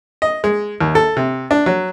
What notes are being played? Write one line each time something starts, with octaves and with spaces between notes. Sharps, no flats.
D#5
G#3
D#2
A4
C3
D4
F#3